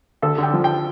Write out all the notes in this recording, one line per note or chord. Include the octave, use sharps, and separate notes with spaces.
D2 A4
D3
G5
F3
G5